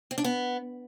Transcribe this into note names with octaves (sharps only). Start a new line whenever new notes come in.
C4
D4
B3